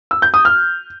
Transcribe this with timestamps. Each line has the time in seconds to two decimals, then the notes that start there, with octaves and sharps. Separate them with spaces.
0.11 E6
0.22 G6
0.34 D#6
0.45 F6